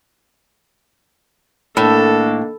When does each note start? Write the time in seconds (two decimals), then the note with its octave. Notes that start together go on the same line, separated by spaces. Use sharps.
1.77 A2 D#3 A#3 D4 A4